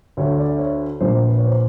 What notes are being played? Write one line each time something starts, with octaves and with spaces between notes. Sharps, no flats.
D2 D3 C#5
D5
C#5
A#1 A#2 C5
B4
C#5
C5